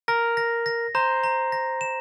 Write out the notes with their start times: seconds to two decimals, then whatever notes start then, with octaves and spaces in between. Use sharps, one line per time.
0.08 A#4 A#6
0.37 A#6
0.66 A#6
0.95 C5 A#5
1.24 A#5
1.52 A#6
1.81 E7